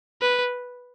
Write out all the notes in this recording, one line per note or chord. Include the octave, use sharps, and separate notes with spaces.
B4